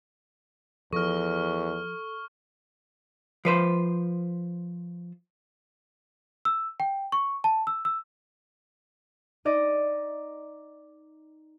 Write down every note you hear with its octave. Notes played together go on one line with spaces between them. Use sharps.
E2 F3 A4 C#6 F6
F3 B4 C5
E6
G5
C#6
A5
E6
E6
D#4 D5 D#5